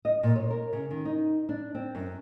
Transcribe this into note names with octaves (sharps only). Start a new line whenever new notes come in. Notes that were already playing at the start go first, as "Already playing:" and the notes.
D#5
A#2
C#5
A#4
C#3
D#3
D#4
D4
C4
F#2